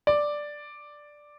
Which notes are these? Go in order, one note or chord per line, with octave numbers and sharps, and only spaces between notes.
D5